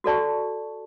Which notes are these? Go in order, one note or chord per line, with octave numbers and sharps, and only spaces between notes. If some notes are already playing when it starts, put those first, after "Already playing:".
F#4 A4 D5 A5 C#6